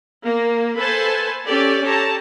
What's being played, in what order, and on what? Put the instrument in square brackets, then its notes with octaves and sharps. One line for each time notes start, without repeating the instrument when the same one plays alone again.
[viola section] A#3
A4 B4 C5 G#5 A5 B5
C#4 G4 A4 D5
G4 A4 C#5 A5 A#5